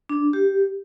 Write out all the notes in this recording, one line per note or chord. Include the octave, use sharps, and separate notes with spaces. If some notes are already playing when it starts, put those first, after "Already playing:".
D4
G4